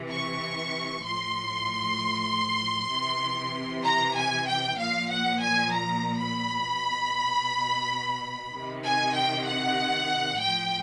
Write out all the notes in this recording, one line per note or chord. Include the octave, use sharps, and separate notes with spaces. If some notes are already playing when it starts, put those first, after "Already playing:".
Already playing: C3 E3
C#6
A2 F3 C6
C3 E3
A#5
G#5
G5
A#2 F3 F5
F#5
G#5
A#5
B5
B2
C3 D#3
G#5
G5
F#5
A2 F3 G5